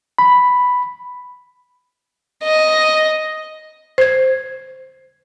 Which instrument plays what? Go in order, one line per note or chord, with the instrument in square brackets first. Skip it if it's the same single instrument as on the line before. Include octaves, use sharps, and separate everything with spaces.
[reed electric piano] B5
[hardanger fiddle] D#5
[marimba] C5 G#6